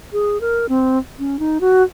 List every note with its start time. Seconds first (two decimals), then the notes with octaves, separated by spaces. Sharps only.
0.13 G#4
0.41 A#4
0.69 C4
1.19 C#4
1.39 D#4
1.61 F#4